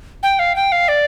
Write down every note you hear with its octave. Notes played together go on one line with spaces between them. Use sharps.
G5
F5
G5
F5
D5